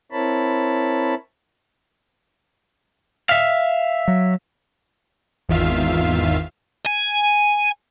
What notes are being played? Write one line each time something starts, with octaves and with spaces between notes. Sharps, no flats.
C4 E4 A#4 C#5 A5 B5
E5 F5
F#3
G#1 E2 D#3 F4 E5 F5
G#5